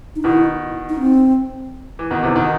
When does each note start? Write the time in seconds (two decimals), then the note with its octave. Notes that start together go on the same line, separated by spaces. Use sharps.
0.16 D#4
0.24 B2 D#3 E4
0.90 D#4
0.99 C4
1.99 E3
2.10 B2 D#3 B3
2.23 C3 E3
2.36 B2 D#3